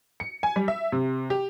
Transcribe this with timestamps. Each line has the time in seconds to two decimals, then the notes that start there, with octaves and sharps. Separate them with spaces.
0.20 C#7
0.43 G#5
0.56 G3
0.68 E5
0.92 C3
1.30 G4